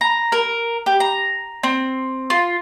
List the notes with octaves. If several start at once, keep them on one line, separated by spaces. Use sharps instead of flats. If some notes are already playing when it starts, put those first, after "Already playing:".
A#5
A#4
G4
A#5
C4
F4